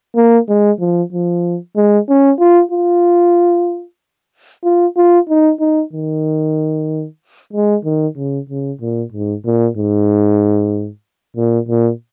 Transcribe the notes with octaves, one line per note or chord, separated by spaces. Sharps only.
A#3
G#3
F3
F3
G#3
C#4
F4
F4
F4
F4
D#4
D#4
D#3
G#3
D#3
C#3
C#3
A#2
G#2
A#2
G#2
A#2
A#2